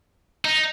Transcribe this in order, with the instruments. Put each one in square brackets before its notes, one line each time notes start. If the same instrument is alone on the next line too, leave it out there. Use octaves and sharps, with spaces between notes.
[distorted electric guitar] D#4